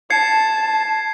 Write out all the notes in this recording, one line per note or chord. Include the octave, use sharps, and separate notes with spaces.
A5 G#6 C7 C#7